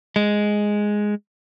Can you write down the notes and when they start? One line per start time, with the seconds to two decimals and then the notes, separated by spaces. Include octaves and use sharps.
0.16 G#3